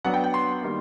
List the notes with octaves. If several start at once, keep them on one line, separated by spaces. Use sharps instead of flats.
F#3 B3 D4 F#5
G5
G5
C6
D#3 G3 A#3